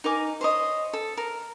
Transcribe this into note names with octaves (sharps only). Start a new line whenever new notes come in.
D#4 A#4 G#5 D6
C5 C#5 D#5
A4
A#4